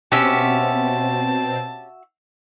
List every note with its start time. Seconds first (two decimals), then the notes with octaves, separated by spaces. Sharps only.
0.12 B2 C4 C#4 F#4 G4 E5 A5